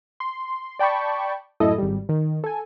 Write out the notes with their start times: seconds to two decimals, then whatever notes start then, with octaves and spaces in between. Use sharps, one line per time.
0.20 C6
0.79 D5 G5 A5 B5 C#6
1.60 F#2 A2 E4 A4 D#5
1.78 G#1 G3
2.09 D#3
2.44 A4 G#5